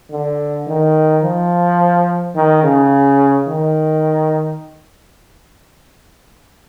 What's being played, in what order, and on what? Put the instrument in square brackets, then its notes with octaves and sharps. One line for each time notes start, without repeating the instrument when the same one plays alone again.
[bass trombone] D3
D#3
F3
D#3
C#3
D#3